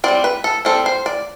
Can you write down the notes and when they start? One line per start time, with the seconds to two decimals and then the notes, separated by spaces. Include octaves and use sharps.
0.04 G3 C4 D5
0.24 B4
0.44 A4
0.65 G3 C4 A4
0.86 C5
1.06 D5